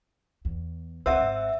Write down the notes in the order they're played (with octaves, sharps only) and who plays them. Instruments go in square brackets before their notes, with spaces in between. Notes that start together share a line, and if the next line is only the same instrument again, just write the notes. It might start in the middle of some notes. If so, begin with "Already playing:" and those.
[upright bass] E2
[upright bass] C#2 C4 [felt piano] C5 F#5 [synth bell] E5 E6
[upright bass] G#1